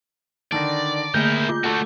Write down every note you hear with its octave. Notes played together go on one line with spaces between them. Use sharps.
D3 D#3 D5 A5 A#6
D3 A3 A#3 E4 G#4 A#4 G6
F4 D6
A3 F#4 A4